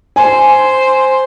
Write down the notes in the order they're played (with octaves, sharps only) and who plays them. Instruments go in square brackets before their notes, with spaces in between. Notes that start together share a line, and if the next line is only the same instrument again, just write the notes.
[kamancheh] C5 [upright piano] G#5